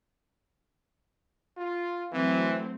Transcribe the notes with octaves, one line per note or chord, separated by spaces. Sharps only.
F4
E3 F#3 A3 C4